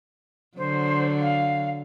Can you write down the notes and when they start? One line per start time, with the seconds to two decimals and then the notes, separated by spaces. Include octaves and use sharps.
0.57 D3 F#3 C5
1.21 F5